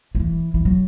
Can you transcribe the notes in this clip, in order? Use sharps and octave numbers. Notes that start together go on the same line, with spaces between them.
F#3
E3
E3
F#3